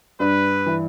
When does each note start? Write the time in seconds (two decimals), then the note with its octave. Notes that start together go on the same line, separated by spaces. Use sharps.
0.20 G2 B4
0.66 E3